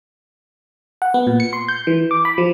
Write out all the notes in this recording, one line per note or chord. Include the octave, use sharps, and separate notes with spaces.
F#5
B3
A#2
C#7
C6
G6
E3
D6
B5
F3